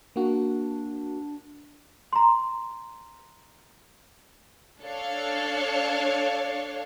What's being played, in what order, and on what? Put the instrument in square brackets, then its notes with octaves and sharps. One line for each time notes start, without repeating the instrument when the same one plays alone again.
[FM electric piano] A#3 F#4 [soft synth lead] D4
[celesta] A#5 C6
[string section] D4 A4 C#5 F5